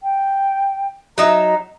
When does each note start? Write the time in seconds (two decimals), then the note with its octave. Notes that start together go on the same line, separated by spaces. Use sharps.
0.03 G5
1.18 F#3 D#4 E5 A#5